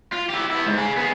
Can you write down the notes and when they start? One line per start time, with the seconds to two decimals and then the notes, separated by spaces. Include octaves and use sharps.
0.13 F4
0.30 E4 G4
0.51 B3 E4
0.67 G#2
0.78 G#4 F5
0.98 B3 G#4